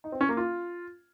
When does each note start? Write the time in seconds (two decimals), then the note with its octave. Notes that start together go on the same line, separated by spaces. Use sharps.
0.04 D#4
0.12 C4
0.21 C#4
0.29 A#3
0.37 F4